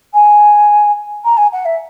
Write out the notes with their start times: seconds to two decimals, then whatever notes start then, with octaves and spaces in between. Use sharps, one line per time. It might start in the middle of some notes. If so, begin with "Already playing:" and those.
0.13 G#5
1.24 A#5
1.37 G#5
1.52 F#5
1.65 E5